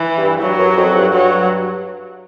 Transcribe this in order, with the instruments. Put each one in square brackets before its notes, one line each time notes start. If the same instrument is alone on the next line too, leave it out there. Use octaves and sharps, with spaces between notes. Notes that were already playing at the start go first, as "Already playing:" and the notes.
Already playing: [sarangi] E3
[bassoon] G2
[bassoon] G2 [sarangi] F#3
[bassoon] F#2
F2
G2
[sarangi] F#3